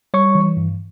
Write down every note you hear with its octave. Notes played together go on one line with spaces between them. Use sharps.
G3 C#5 C#6
E3
G2